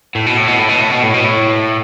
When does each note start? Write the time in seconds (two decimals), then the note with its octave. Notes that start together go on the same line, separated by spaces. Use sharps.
0.15 A2
0.26 B2
0.37 A2
0.48 B2
0.59 A2
0.69 B2
0.81 A2
0.91 B2
1.03 A2
1.14 B2
1.24 A2